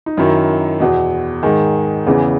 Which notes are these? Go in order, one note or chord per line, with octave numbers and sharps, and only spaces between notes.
D#4
F#2 D#3 E4
E2 B2
G#2 D#3 G#4
E2 C#3 E3